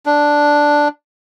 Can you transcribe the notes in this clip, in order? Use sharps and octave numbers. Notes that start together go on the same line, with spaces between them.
D4